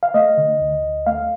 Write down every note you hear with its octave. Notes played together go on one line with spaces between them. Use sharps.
F5
A3 D#5
D3
D2
D2
A3 F5